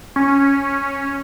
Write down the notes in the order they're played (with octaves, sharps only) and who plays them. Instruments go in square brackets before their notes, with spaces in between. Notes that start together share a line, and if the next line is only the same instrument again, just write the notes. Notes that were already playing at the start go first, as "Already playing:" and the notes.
[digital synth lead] C#4